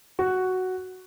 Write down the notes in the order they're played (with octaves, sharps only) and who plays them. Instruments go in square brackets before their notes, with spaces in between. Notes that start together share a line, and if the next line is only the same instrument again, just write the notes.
[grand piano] F#4